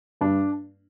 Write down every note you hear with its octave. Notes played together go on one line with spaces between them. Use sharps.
G2 D4